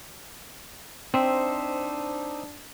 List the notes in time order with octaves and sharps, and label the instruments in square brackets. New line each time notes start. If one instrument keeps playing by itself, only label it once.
[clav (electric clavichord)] C4 [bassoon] D4 [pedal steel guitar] D#4 C5 E5